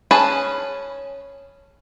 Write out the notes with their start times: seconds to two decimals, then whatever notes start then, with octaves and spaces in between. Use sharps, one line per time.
0.11 C#4 G#4 B4 A5